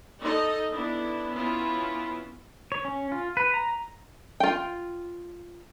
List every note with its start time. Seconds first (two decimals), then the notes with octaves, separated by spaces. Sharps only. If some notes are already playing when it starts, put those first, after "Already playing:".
0.21 D#4 A4 D#5
0.72 B3 D4 E4
1.33 B3 C#4 E4 F4
2.72 C#5
2.85 C#4
3.12 F4
3.37 B4
3.54 A#5
4.40 F4 G5